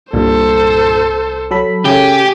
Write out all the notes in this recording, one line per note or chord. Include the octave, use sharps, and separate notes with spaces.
C2 G2 A#2 A4 C5
F#3 A4 B5
C#3 A3 G4 G#5